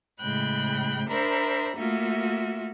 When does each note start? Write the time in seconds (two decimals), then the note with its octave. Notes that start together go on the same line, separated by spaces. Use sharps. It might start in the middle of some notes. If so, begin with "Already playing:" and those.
0.20 A2 C#3 G#3 G5 B5 F#6
1.08 D4 A#4 C5 E5 A#5 B5
1.75 A3 A#3 F4 F#4 E5